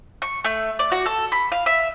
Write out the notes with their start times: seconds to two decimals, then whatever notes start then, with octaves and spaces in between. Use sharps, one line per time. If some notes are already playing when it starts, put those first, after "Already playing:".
0.22 C#6
0.45 A3
0.79 D5
0.92 F#4
1.06 A4
1.32 B5
1.52 F5
1.66 E5